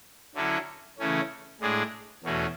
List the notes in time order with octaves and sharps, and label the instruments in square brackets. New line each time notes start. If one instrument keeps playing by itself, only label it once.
[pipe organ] D3 F#3 C#4 E4 A4
C#3 E3 A3 C#4
A2 G#3 D4 G#4 D5
E2 B2 A3 C#4 F#4